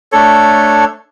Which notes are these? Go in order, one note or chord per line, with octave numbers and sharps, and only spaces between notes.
A3 D4 A4 C#5